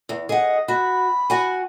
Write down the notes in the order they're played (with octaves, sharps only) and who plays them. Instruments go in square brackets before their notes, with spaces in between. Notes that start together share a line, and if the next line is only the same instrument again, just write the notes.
[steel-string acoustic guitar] E2
[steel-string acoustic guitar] G#4 F#5 [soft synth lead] D#5
[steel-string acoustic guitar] F#4 [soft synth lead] B5
[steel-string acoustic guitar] F#4 F#5 G#5